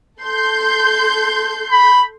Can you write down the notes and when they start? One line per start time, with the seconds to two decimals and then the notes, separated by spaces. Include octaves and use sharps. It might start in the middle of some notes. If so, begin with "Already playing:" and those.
0.21 A4 C6 G6
1.72 B5